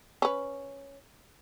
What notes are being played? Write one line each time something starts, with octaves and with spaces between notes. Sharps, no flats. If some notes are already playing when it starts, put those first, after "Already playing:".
C#4 B4